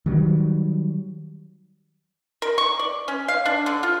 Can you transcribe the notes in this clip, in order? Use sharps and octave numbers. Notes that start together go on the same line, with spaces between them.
D#3 F#3 G3
A#4
C#6
D5
C#4
F5
D4
D3
F4